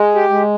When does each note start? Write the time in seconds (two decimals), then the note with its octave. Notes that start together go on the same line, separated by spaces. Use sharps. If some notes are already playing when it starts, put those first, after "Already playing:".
Already playing: G#3
0.15 G4
0.30 G#3